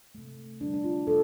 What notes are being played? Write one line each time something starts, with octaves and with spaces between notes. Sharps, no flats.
C3 A3
D3 G3 D4
D4
F4
C3 F3 A4